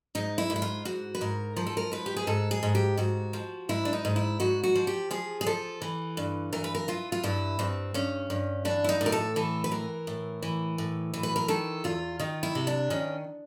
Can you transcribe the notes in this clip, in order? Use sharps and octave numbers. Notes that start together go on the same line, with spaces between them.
G#2 D#4
E4
G#2
E4
F4
G#2 F#4
B4
G#2 A#4
F3 A#4
A4
A#4
G#2 B4
G4
G#4
G#2 A4
G#4
G#2
G4
G#2 F#4
F3
G#2 E4
D4
D#4
G#2
E4
G#2 F#4
F#4
F3
G4
F3 G#4
G#4
F3 A4
E3
G2
E3 A#4
B4
A#4
E3 F4
F4
G2 E4
G2 C4
G2 C#4
G2
E3 D4
E4
D#4
A2
A#4
A4
E3 A4
B4
E3 A#4
A2
E3
A2
E3
B4
A#4
D#3 A4
E2 F4
D#3 F4
E4
C3
D4
D#3 C#4